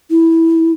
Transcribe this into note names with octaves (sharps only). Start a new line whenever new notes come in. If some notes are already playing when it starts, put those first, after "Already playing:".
E4